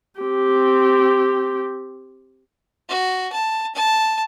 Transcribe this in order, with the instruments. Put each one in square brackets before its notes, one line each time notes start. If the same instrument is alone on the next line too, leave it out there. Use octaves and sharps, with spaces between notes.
[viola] C4 G4
[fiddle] F#4
A5
A5